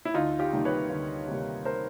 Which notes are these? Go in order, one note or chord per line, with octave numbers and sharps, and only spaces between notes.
E4
D2 D#4 F4
F4 G4
C3 D#3 G3 A#3
B4 C#5
D2
C3 D#3 G3 A#3
A#4 C5